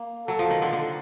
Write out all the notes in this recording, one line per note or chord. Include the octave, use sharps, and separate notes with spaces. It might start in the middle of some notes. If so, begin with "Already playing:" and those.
Already playing: A#3
F#3 A4
F3
D#3
D3
D3